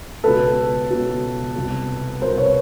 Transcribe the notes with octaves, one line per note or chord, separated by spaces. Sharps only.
C#2 B2 A4 B4
C#2 B2
C2 B2
C2 B2 A#4 C5
B4 C#5